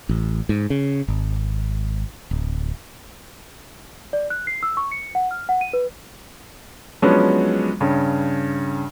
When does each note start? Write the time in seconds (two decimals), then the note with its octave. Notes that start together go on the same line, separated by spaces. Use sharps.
0.09 A1
0.49 G#2
0.70 C#3
1.08 G#1
2.31 D1
4.13 D5
4.30 F#6
4.47 C7
4.63 E6
4.77 C#6
4.92 C#7
5.15 F#5
5.31 F6
5.49 F#5
5.61 D#7
5.73 B4
7.02 F3 F#3 G#3 B3 C#4 D4
7.80 G2 C#3